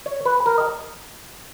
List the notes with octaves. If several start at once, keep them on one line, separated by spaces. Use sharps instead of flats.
C#5
B4
A#4
D#5